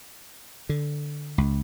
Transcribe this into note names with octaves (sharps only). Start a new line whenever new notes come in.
D3
C#2